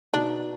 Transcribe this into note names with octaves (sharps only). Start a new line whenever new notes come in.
B2 B3 D4 D#4